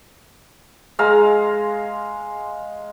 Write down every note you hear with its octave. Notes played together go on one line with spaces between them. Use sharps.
G#3 F5 A#5